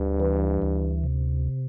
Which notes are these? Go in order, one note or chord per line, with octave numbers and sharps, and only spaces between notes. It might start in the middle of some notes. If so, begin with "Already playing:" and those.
Already playing: D2 G2
E3
D2
C3